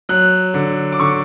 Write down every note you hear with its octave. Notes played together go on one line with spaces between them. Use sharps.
F#3 F#6
D3
D6
D3 C#6